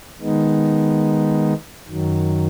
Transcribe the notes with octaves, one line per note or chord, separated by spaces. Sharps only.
D#3 G#3 B3 D#4
F#2 D#3 F#3